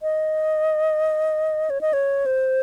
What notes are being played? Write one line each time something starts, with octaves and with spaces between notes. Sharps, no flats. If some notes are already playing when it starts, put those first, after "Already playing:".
D#5
C#5
D#5
C#5
C5